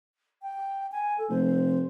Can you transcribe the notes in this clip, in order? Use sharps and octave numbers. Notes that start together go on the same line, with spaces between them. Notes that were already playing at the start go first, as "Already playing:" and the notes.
G5
G#5
A4
F1 C5